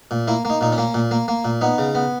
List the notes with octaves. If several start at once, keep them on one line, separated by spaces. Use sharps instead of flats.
A#2
A#3 E4
A#3 D#4
A#2 D#4
C#4
A#3
A#2
A#3
A#3
A#2
B3 D#4
C#3
B3